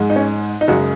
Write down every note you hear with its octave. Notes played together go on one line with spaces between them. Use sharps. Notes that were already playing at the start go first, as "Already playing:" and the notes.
Already playing: G#2 G#3
D#4
C#4
D#4
F#2 C#3 G#3 F#4